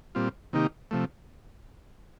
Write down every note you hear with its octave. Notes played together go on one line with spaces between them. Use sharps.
A#2 G3 C4 F4
C3 D#3 A#3 D#4 G4
C3 F3 A3